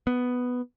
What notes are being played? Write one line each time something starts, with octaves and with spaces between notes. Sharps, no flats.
B3